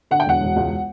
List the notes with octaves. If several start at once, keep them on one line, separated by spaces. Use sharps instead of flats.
D3 F#5
G5
E1 F#5
E1
C#2